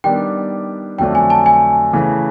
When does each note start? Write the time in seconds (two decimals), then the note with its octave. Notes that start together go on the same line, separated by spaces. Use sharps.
0.04 D#3 G3 B3 D4 G4 G5
0.98 F2 D3 F#3 A3 D4 G5
1.15 G#5
1.30 A5
1.46 G#5
1.93 C#3 E3 A3